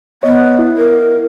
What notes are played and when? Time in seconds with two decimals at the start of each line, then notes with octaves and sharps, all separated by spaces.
0.23 B3 C#5 D#5
0.59 E4
0.77 A#4